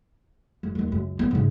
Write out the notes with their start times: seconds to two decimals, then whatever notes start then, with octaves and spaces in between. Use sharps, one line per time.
0.63 F#2
0.75 D#2 F#3
0.92 C#2 F#2
1.19 B3
1.31 G#2 C#3